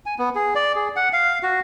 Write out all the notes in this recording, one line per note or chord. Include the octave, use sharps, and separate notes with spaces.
G#5
B3
G#4
D5
G#4
F#5
F5
F#4